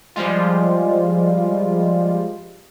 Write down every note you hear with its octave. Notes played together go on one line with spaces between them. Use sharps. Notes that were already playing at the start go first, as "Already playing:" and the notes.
F3 G3 G#3 F4